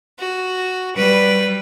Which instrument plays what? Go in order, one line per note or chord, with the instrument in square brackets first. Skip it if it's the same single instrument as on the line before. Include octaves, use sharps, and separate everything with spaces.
[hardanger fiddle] F#4
[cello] G3 [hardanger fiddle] B4